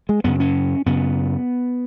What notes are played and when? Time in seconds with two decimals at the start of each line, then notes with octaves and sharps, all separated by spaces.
0.09 G#3
0.24 F#2 C#3 B3
0.40 C#4
0.86 F#2 C#3 B3